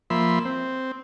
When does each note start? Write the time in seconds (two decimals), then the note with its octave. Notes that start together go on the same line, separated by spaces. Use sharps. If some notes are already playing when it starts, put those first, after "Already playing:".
0.10 F3 A#3 E5 B5 C6
0.45 C4